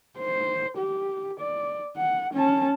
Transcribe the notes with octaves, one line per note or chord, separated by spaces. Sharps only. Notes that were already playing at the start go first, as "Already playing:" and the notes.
C5
G4
D5
F#5
C#4 A5